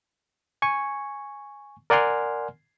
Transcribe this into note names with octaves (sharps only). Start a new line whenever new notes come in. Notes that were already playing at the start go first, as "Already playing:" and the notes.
G#5 C#6
A#4 D5 F#5 G#5 C6 F6